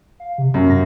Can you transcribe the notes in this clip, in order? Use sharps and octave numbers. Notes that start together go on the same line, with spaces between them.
F5
C3
F#2 C#4
A#6